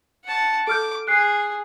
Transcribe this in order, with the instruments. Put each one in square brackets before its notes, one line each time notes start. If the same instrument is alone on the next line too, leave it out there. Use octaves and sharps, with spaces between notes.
[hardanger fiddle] F#5 A5
[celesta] A4 F6 G6 [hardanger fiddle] D6
[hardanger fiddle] G#4 [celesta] F#6 C7